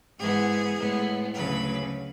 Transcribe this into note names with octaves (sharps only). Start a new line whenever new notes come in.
G#2 E3 G#3 B3 G#4
A2 G#3 B3
D2 C#3 F#3 B4